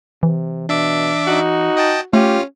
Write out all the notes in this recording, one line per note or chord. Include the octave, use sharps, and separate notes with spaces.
C3 E3
B2 D4 E5 D6
D#4 F#4
D#5 G5 A5
A3 C#4 F4 G4